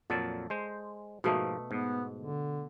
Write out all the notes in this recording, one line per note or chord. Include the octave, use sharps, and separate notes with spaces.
F2 A#2 F#3 A4 D5
G#3 C5
G#2 B2 F3 A3 A#3
G#2 B3
D3